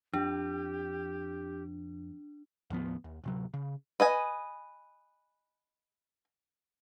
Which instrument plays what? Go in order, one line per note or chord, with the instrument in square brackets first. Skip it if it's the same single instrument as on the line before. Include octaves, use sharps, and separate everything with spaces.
[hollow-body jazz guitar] F2 [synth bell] D4 [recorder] G4
[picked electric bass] D#2 A2 F3 B3
D#2
D1 C3 F#3
C#3
[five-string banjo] B4 D#5 G#5